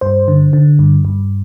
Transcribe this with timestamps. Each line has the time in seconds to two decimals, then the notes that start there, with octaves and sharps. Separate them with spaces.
0.01 G2 C5
0.28 D3
0.53 D3
0.79 G2
1.05 G2